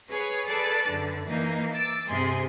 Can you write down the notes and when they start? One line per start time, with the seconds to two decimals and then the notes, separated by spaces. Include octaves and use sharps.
0.12 G#4 B4 C#5
0.48 G#4 A4 B4 D5 A5
0.89 F#2 D3
1.29 E3 A#3 D#4
1.74 D6 E6 A6
2.08 G2 C3 G#4 C6